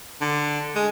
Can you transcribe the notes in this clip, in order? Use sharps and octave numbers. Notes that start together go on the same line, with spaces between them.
D3
G#3